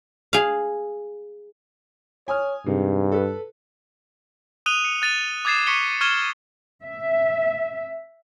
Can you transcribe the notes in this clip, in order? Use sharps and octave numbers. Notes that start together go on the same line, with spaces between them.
G#4 F5
C#5 G#5 D#6 F6
G2 C3 D#3 G#3
A4 B4
D#6 F#6 D#7 F7 G7
C#7
F#6 A6 D#7 F7
D6 D#6 G#6 A6 C7 E7
C#6 B6 C#7 D#7 G7
C#6 F6 G#6 E7 G7
E5